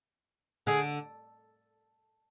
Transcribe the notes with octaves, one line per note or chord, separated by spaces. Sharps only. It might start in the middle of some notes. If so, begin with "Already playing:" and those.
D3 G#4